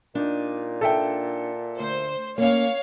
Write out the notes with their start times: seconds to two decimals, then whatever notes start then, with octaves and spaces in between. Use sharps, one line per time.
0.15 A#2 D4 D#4
0.81 A4 E5 G5
1.79 D2 C5
2.38 A#3 C#4 C#5 F5